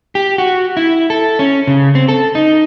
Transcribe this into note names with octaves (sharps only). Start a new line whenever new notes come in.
G4
F#4
E4
A4
C#4
C#3
C4
A4
D#4